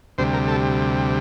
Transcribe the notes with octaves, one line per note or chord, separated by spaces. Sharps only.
D2 C3 G3 C5
A#4
A4